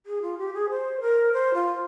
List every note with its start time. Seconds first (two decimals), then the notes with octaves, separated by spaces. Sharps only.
0.06 G#4
0.22 F4
0.38 G4
0.54 G#4
0.70 C5
1.01 A#4
1.33 C5
1.54 F4